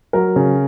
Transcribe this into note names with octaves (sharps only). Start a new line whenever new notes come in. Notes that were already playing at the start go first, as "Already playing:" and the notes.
F#3 A#4
C#3